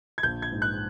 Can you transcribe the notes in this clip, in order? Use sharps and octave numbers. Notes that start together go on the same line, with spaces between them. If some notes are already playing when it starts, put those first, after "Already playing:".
G#6
A#1 G6
G#6
G#2
F#6